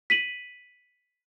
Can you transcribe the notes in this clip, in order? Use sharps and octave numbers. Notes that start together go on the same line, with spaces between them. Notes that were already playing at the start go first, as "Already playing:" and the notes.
B6 D#7 F#7